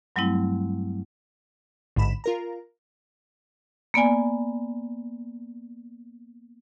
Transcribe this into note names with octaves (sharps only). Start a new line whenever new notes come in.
G2 F#3 G3 A3 C4 E4
A1 G#2 D3 B5 E7
F4 A#4 A#5
A#3 B3 D5 G#5